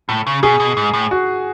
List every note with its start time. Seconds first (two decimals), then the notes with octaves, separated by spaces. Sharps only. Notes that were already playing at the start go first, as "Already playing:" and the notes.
0.09 A2
0.27 C#3
0.43 B2 G#4
0.60 B2
0.77 G#2
0.93 A2
1.11 F#4